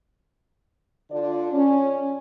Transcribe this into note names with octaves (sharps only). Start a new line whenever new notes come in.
D3 D4 F4 D5
C#4